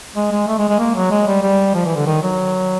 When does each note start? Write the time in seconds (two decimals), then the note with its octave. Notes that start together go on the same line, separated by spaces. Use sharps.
0.16 G#3
0.31 G#3
0.48 A3
0.58 G#3
0.69 G#3
0.79 A#3
0.95 F#3
1.11 G#3
1.27 G3
1.42 G3
1.74 F3
1.85 E3
1.95 D3
2.06 D#3
2.22 F#3